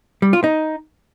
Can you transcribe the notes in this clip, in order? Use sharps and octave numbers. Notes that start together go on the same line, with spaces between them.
G3
F4
D#4